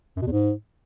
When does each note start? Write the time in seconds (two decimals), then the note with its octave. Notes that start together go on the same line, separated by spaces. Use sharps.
0.17 F#2
0.22 B2
0.27 E2
0.32 G#2